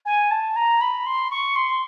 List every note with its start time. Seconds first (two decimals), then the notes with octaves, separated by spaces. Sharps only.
0.05 G#5
0.31 A5
0.56 A#5
0.81 B5
1.06 C6
1.30 C#6
1.55 C6